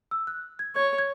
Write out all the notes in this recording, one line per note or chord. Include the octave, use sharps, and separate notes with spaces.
E6
F#6
G#6
C#5 G#6
G#6